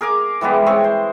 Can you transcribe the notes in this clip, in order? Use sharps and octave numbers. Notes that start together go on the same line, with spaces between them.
G#4 A#4 G#5 D6
E3 G3 G#3 B3
C4 G#4 C#5
C5